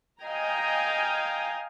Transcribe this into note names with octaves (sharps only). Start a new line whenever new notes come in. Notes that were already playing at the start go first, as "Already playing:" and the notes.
D#5 F5 G5 G#5 A#5